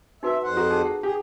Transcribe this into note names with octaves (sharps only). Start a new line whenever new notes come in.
D#4 F#4 B4 E5
F2 C5 F#5
F#4 A4 A#5
D#4 G#4 A5
F#5
G4 G#4